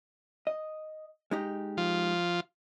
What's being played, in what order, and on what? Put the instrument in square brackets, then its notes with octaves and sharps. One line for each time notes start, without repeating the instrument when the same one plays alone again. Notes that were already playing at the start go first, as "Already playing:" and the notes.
[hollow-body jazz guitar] D#5
G#3 D#4 G4
[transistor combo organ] F3 F4